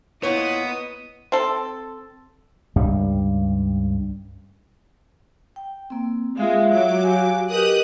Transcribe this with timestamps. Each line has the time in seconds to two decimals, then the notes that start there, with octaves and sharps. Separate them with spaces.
0.23 A#2 B3 E4 C#5 D#5 D#6
1.32 C4 A4
2.76 C#2 G2 G3
5.56 G5
5.90 A#3 C4
6.37 G#3 F4 E5 F5
6.72 F#3 D6
7.03 G4 F5 G#5
7.50 G4 A#4 B4 D#5 D#6 F#6